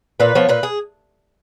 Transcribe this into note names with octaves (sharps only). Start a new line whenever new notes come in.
A#2 B4
F3 B3 C#5
A#2 B4
G#4